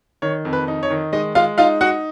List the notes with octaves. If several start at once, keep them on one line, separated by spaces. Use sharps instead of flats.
D#3 C#5
F2
B4
D#4
C#5
D#3
G#3 D#4 D#5
G#3 F4 F5
D#4 F4 F5
D#4 F#4 F#5